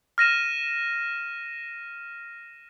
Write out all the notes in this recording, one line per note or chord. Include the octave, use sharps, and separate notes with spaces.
F6 A#6 D#7 E7